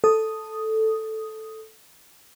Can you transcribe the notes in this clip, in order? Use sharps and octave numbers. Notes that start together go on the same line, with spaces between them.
A4 D#6